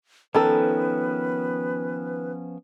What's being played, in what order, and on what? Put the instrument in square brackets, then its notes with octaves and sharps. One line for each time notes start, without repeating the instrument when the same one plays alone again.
[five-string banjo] D#3 A4 [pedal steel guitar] F3 B3 C#4 [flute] B4